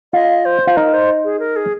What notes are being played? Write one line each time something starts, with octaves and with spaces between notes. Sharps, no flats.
F4 D#5
C5
F4
D#4 A#4
C5
G#4
A#4
G#4